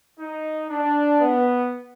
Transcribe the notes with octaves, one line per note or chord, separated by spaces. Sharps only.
D#4
D4
B3